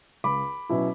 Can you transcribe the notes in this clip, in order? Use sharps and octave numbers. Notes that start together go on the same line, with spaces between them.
C#2 B5 D6
B2 F#3 C#4 E4